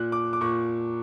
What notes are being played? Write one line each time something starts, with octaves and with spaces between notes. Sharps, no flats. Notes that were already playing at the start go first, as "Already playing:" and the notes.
Already playing: A#2 F#6
D6
D6
A#2 C#6